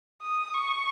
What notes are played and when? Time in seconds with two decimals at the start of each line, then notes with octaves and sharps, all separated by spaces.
0.22 D#6
0.54 C#6